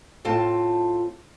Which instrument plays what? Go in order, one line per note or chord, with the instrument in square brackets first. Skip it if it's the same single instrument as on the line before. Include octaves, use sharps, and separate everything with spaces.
[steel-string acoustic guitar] A2 C4 F4 A5